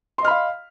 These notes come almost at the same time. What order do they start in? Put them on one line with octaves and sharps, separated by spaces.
C6 D#5 F6 B5 F5